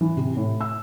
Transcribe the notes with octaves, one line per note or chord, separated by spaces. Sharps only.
E3
C3
A2
E6